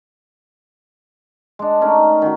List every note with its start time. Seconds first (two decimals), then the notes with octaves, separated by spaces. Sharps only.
1.59 G#3 D4
1.81 A3 C#4 D#4 A#4
2.22 D#3 C#4 F#4